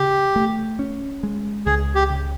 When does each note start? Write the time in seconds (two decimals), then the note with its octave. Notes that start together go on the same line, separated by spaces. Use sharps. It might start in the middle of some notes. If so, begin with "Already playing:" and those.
Already playing: C#3 G4
0.36 A3
0.79 C#4
1.23 G#3
1.66 C#2 G#4
1.95 G4
2.10 C#3